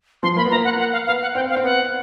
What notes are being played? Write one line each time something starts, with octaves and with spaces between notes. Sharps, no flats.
F3 C6
A#3 B5
B3
A#3 A#5
F#5
F#5
F5
B3 F5
F#5
C4 G5
F5
C4
B3 F#5